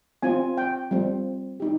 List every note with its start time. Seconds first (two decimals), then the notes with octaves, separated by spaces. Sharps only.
0.23 C4 F4 G#5
0.57 G5
0.91 G3 C4 F4
1.60 D#4 G4